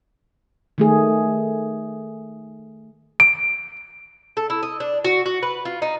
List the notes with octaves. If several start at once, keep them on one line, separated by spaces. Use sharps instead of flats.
D#3 A3 G#4
D7
A4
E4
D#5
D4
F#4
F#4
B4
F4
D#4